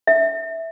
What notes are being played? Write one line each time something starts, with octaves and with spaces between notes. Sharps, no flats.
E5